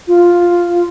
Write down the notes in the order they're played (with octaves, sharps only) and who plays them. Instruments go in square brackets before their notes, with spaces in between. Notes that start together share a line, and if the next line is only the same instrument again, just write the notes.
[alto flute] F4